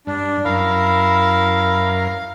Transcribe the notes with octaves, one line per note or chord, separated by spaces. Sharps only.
G2 D4
F#2 E4 A#4 F5